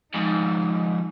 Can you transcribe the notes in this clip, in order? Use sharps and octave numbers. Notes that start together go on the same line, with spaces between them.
F2 G#2 D#4